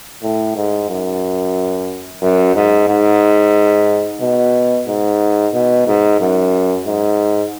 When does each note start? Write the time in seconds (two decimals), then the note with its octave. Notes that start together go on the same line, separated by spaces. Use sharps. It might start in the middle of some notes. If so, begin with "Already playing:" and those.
0.23 A2
0.56 G#2
0.90 F#2
2.22 F#2
2.56 G#2
2.88 G#2
4.21 B2
4.88 G#2
5.54 B2
5.87 G#2
6.20 F#2
6.86 G#2